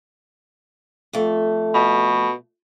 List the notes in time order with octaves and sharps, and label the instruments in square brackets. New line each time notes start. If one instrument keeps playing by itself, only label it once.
[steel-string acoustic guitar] F2 A3
[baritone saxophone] B2